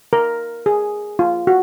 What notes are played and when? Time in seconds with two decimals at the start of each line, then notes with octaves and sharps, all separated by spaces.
0.13 A#4
0.66 G#4
1.19 F4
1.47 F#4